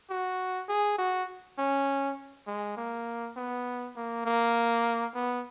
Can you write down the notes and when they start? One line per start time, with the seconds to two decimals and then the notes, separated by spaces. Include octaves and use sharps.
0.10 F#4
0.69 G#4
0.98 F#4
1.58 C#4
2.47 G#3
2.77 A#3
3.37 B3
3.96 A#3
4.26 A#3
5.15 B3